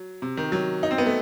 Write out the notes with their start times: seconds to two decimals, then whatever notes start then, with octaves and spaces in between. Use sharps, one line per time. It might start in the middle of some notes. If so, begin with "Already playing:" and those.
Already playing: F#3
0.22 C3
0.37 D#3
0.52 F#3
0.83 D#4
0.91 C4
0.98 B3
1.06 A3